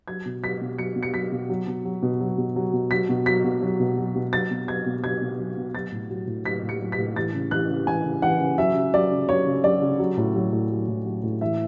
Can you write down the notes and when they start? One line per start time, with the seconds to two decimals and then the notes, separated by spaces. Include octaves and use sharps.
0.08 F#3 G#6
0.26 B2
0.43 F#3 B6
0.61 B2
0.78 F#3 C#7
0.96 B2
1.03 C#7
1.14 F#3 B6
1.32 B2
1.49 F#3
1.67 B2
1.85 F#3
2.02 B2
2.21 F#3
2.38 B2
2.56 F#3
2.73 B2
2.91 F#3 B6
3.09 B2
3.26 F#3 B6
3.44 B2
3.62 F#3
3.80 B2
3.97 F#3
4.15 B2
4.33 F#3 A6
4.51 B2
4.68 F#3 G#6
4.86 B2
5.03 F#3 G#6
5.21 B2
5.39 F#3
5.57 B2
5.75 F#3 A6
5.92 A2
6.10 F#3
6.27 A2
6.45 F#3 B6
6.63 A2
6.69 C#7
6.81 F#3
6.92 B6
6.98 A2
7.16 E3 A6
7.34 C#3
7.51 E3 F#6
7.69 C#3
7.87 E3 G#5
8.04 C#3
8.22 E3 F#5
8.40 C#3
8.58 F#3 E5
8.75 C#3
8.94 F#3 D5
9.11 C#3
9.29 F#3 C#5
9.46 C#3
9.64 F#3 D5
9.81 C#3
9.99 F#3
10.18 A2
10.35 F#3
10.53 A2
10.71 F#3
10.88 A2
11.06 F#3
11.23 A2
11.41 E3 E5